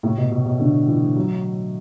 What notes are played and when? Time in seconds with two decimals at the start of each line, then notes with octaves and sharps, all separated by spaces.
0.03 A2
0.18 B2
0.31 B2
0.45 B2
0.59 D3
0.88 E3
1.16 F#3